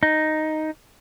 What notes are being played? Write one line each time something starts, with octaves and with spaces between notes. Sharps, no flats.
D#4